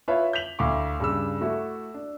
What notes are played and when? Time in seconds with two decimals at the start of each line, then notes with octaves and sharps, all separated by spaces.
0.08 E4 F4 B4 C#5 E5
0.33 G6 B6 F7 F#7
0.59 D2 E4 F5 C#6 D6
1.00 G2 C#3 E6
1.41 A3 E4 F#4 A4
1.94 D4